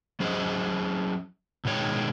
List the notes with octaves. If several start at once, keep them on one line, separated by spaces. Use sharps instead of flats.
F#3 C#4 G#4 C5 D#5
B2 D#3 G#3 C#5 G5